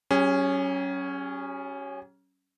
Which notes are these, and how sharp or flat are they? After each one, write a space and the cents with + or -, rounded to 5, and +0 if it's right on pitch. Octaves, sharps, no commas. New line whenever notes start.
F#3 +35 C#4 +0 G#4 -35